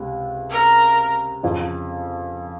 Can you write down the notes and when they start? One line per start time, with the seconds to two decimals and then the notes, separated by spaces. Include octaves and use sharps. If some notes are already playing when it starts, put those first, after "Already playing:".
Already playing: C#2 C3
0.50 A#4
1.43 F2 C#3 F3